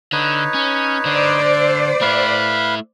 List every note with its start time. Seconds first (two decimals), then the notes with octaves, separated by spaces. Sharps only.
0.12 D3 D#4 B4 C#5
0.54 C#4
1.06 D3 C5 D5
2.01 A3 E4 B4 F5 B5